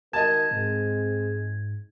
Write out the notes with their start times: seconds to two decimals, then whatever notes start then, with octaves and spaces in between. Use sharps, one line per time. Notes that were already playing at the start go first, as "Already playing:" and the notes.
0.13 D#3 F#4 A#4 D#5 A5 G#6
0.51 G#2 G#3 C4